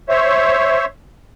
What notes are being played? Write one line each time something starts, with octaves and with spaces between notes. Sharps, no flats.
C5 C#5 E5